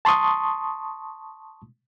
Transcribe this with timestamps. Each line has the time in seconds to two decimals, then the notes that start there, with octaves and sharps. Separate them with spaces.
0.05 A5 C6 C#6 D#6